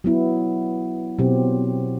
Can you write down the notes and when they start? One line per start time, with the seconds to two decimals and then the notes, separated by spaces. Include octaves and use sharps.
0.04 F#3 B3 E4
1.19 B2 F#3 C4 G4